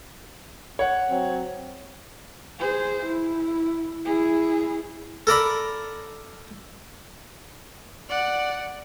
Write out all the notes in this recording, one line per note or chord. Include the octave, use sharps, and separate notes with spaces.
C#5 F#5
F#3 C4
G#4 C5
E4
E4 G#4
A4 A#4 D5 B5
D5 F#5